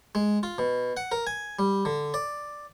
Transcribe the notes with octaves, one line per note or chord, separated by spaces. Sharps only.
G#3
F4
B2
F#5
A#4
G#5
G3
D3
D5